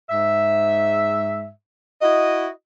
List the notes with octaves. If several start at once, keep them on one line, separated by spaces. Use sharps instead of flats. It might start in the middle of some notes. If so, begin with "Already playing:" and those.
G#2 E5
E4 F#4 D#5